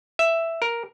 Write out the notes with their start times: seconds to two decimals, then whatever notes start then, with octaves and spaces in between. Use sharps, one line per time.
0.19 E5
0.62 A#4